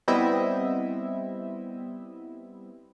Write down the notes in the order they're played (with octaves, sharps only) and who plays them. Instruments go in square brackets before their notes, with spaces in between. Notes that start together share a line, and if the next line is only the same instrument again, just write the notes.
[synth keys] G3 B3 C4 E4 D#5 E5